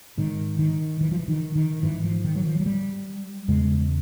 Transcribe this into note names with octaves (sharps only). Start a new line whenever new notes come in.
G#2 D#3
D#3
E3
F3
E3
D#3
D#3
G#2 E3
F3
D#3
F#3
F3
F#3
G3
E2 C#3 G#3